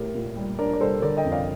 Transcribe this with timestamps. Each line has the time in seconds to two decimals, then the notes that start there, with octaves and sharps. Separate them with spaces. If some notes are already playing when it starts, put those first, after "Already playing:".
Already playing: A2 G4 A#4
0.15 A#2
0.36 G3
0.59 D4 A#4 D5
0.74 D5
0.81 G3 A4 C5
1.02 D3 A#4 D5
1.17 D#5 G5
1.25 F2
1.32 D5 F5